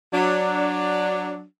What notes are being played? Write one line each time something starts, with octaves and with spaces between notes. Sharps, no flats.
F#3 D4